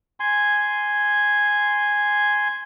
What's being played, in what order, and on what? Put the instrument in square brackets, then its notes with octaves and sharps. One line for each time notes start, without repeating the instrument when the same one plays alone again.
[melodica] G#5 C6